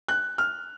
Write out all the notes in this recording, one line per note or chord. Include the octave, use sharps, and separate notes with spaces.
F#6
F6